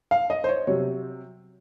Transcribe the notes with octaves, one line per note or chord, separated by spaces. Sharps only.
F5
D#5
C5
C#5
C3 F#3 C#5